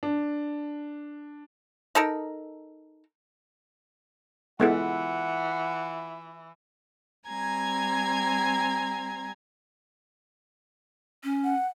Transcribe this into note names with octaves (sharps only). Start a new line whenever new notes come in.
D4
D#4 A4 A#4
E3 G#3 B3 E4 F4 A4 E5 F#5
G3 C4 G#5 A#5 G#6
C#4
F#5